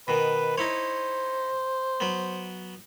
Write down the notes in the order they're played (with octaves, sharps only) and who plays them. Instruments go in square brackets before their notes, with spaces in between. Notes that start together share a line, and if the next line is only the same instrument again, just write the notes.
[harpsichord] B2 D#3 [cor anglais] B4
[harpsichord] D#4 E4 C#5 [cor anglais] C5
[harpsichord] F#3 B3